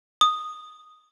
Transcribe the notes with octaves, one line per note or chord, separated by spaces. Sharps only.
D#6